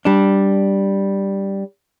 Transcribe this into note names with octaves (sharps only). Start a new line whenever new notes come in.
G3 D4